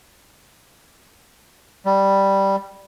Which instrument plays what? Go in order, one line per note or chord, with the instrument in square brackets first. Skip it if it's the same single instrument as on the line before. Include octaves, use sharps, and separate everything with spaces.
[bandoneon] G3